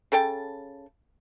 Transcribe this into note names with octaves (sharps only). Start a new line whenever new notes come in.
C#3 A4 G5 A5